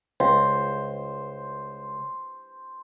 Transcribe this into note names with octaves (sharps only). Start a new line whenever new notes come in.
C#2 C5